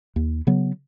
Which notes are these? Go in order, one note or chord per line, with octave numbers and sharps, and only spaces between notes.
D#2
C#3 F#3 B3